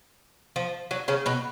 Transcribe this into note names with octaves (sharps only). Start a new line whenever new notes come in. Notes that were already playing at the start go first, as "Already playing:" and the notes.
F3
F#3
C#3 C#4
B2 B3